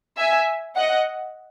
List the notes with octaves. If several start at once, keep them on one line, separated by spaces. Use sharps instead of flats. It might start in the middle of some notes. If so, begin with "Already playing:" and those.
E5 G#5
D#5 F#5